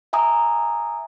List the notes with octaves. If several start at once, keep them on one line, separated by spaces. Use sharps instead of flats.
E5 G#5 A#5 D#6